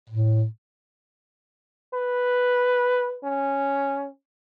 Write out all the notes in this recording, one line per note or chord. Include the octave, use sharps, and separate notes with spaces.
A2
B4
C#4